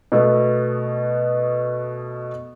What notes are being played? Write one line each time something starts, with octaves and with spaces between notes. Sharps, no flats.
B2 A3 B3